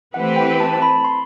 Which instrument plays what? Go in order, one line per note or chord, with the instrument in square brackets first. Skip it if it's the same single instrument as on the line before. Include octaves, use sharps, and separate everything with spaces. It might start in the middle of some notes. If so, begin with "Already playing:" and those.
[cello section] E3 A3 C4 G4 B4 [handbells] F#5
[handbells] G5
A5
A5
B5
C6